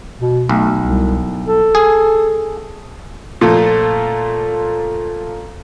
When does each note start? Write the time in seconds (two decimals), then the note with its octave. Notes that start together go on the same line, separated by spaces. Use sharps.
0.20 B2
0.49 B1 A3
0.79 C2
1.47 A4
1.75 G#4
3.41 A#2 F3 A3 F4 A4